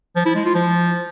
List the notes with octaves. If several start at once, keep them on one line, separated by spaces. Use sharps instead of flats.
F3
E4
G#3
F4
F3